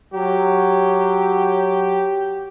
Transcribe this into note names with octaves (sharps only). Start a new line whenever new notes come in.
F#3 G4